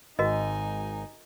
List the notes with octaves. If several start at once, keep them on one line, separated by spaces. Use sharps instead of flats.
G#1 D#4 F#4 A#4 D#5 G#5